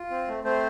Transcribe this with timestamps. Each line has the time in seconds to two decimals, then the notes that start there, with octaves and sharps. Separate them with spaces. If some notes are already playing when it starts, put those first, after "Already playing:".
Already playing: F4
0.10 C4
0.28 A3
0.44 A3 C4 C5